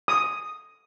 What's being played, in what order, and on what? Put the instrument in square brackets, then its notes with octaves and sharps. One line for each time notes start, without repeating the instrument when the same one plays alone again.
[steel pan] D#6